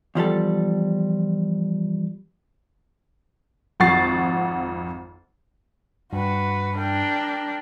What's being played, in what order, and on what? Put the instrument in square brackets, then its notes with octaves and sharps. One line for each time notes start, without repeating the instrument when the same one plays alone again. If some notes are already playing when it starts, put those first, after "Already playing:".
[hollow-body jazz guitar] E2 F3 G3 A4
[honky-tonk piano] G#1 F2 F#5 C#6 A6 C7
[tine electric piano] G2 [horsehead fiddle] F#4 B4
[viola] D4 [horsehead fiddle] A#4 G5